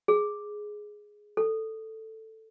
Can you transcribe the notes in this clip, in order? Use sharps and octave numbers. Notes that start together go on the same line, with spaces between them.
G#4
A4